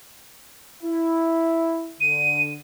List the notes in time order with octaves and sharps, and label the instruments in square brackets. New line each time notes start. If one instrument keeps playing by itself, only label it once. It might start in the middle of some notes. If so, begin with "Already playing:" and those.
[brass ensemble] E4
[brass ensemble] D3 [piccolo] D#7